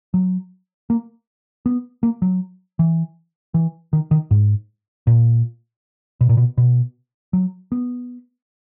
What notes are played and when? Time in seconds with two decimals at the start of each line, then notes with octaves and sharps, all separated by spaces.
0.14 F#3
0.90 A#3
1.66 B3
2.03 A#3
2.22 F#3
2.79 E3
3.54 E3
3.93 D#3
4.11 D#3
4.31 G#2
5.07 A#2
6.21 B2
6.29 A#2
6.37 B2
6.58 B2
7.33 F#3
7.72 B3